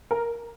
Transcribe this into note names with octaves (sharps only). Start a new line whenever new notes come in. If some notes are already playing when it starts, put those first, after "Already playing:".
A#4